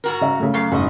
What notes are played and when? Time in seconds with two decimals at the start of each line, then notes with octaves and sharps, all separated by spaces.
0.04 G#2 F#4 A#4
0.21 C#3 E5
0.39 C#3 A3
0.54 F#2 G#3 F5
0.72 F#1 G#2 F#4 D#5